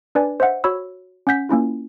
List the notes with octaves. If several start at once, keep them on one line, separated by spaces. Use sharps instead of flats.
D4 B4 D5 G#5
C5 D#5 E5 F#5
F#4 C#5 B5 E6
C#4 F#5 G6 B6
A#3 C#4 E4 F4